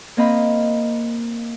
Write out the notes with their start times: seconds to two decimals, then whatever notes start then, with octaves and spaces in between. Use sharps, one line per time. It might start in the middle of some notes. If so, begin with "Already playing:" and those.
0.17 A#3 C4 D#5 F5 B5